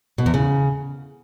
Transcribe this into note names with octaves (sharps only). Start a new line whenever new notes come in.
B2
E2
C#3